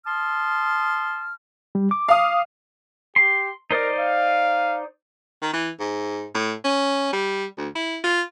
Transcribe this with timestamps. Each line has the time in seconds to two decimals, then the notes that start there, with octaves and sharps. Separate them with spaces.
0.06 A5 C6 D#6 F6
1.75 G3
1.91 D6
2.08 F5 D#6
3.16 G4 C6
3.71 D#4 A#4 C5 D5
4.00 F5
5.42 D#3
5.53 E3
5.80 G#2
6.34 A2
6.64 C#4
7.13 G3
7.57 D2
7.75 E4
8.04 F4